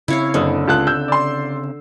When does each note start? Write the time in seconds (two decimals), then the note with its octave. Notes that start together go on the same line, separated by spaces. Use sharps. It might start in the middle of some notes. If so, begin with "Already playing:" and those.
0.08 C#3 C4 E4 C#5 F5
0.34 F#1 D3 C#5 D#6 E6
0.68 C#2 A5 D#6 F#6
0.87 E6 G6
1.08 D5 C6